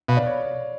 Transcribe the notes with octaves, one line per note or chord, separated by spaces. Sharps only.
B2 F5
D5
C#5